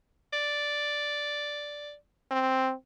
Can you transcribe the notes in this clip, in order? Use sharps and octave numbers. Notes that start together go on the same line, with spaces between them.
D5
C4